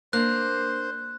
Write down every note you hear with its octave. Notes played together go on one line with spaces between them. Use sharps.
A#3 D4 C5 F#6